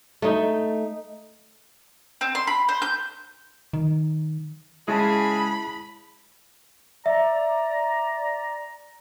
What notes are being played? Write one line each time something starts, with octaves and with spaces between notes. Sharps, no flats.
A3 D#4
C4
C6
B5
C5
G6
D#3
C#3 G#3 E4 G#4 A5 B5
D5 E5 A#5